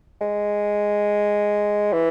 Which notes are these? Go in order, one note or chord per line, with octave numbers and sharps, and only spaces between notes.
G#3
E3